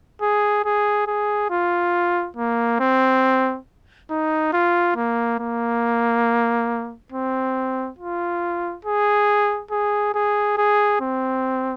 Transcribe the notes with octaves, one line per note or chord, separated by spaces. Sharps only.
G#4
G#4
G#4
F4
A#3
C4
D#4
F4
A#3
A#3
C4
F4
G#4
G#4
G#4
G#4
C4